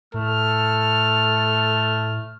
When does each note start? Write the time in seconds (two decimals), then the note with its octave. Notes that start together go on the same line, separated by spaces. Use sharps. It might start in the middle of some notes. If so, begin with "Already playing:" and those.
0.14 A2 A3 A4 F6